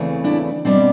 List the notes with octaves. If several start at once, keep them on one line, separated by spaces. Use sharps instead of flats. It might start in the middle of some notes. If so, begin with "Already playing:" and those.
Already playing: E2 C#3 E3 A3 C4
D4 E4
B2 G3 B3 C4 D4